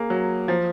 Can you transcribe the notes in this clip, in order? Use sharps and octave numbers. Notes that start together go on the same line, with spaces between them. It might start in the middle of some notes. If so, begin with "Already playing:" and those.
Already playing: A#3 G#4
F#3
F3